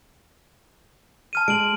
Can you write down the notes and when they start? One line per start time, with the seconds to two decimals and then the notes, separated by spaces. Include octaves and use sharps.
1.33 A5 F6 D#7
1.48 G#3 D7 F#7